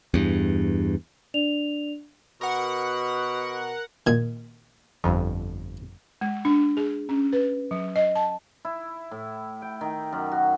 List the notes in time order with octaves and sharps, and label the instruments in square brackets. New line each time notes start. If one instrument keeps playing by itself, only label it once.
[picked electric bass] E2 G2
[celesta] D4 D5 F7
[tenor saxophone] B2 [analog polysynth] A#4 F#5
[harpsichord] A#2 D#3 [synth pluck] G#6
[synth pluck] G1 F2
[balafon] G#3
D4
G#4
C#4
B4
F#3
D#5
A5
[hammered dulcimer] E4
A2
G5
D#3
F#2
F#4